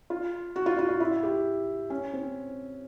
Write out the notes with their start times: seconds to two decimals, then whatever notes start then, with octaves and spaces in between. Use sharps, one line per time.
0.10 F4
0.56 F#4
0.66 F4
0.79 F4
0.89 F4
1.00 E4
1.23 G4
1.90 C#4
2.13 C4